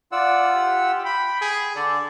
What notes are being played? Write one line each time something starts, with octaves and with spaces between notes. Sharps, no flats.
F4 D5 F#5 E6
G4
G5 B5
G#4
D3 A4 D5